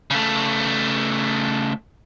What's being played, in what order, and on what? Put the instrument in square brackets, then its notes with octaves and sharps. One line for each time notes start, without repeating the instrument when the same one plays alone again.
[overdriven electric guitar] C#3 A3